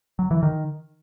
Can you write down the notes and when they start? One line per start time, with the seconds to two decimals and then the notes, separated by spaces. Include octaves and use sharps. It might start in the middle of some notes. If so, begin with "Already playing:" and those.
0.19 F#3
0.31 E3
0.43 D#3